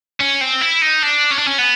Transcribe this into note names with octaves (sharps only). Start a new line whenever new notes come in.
C#4
C4
E4
D#4
D4
C#4
D4
C#4
B3